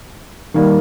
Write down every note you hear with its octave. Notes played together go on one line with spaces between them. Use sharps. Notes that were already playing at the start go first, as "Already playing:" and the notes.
D#3 G3 A#3